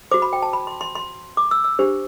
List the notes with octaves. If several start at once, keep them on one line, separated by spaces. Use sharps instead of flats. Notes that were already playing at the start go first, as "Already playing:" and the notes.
F#4 C5 D6
B5
G5
A5
B5
C6
C6
C6
D6
E6
E6
D4 G4 C5